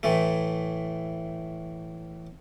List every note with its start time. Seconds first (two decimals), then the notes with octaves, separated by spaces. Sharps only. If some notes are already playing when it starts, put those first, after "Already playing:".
0.03 A2 E3 A3